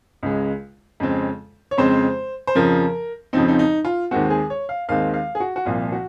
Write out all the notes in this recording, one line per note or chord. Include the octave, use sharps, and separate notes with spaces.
C#2 C#3 G#3
F2 C#3 G#3 C4
C#5
F2 C#3 G#3 C4 C5
C5
F2 C#3 F3 C4 A#4
F2 C#3 F3 C4 D#4
D#4
D#4
F4
D#2 D#3 G#3 C4 F#4
G#4
C#5
F5
D#2 D#3 G#3 C4 F5
F5
G#4
F#4
F#4
C2 A#2 F3 F4
F#4